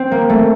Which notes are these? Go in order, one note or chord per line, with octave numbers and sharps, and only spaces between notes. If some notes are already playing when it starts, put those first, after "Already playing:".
Already playing: C4
A#3
A3